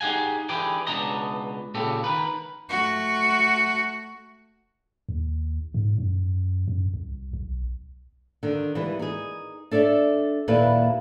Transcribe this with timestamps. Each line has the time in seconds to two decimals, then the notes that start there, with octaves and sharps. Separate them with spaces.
0.01 D#4 G4 G#4 F#5 G#5
0.49 D3 E3 G4 G#4 B4 G5
0.87 C#2 B2 D4 D#5 A#5
1.74 A#2 C#3 B3 G4 A4
2.04 D#3 A#4 B4
2.70 A3 F#4
5.09 D#2
5.74 G#2
5.98 F#2
6.68 F#2
6.94 C2
7.33 B1
8.43 D3 D#3
8.75 E3 G3 G#3 B3 E4
8.99 D#4 G#4
9.71 D4 A4 C#5 D5 E5
10.48 D#2 A#2 E4 A4 B4 D5